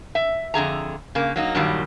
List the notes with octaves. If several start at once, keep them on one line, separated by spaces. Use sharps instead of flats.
E5
F2 D3 G#4 A#5
C#3 A#3
F#3 A#3 D#4
G2 A#2 D#3 F#3 G3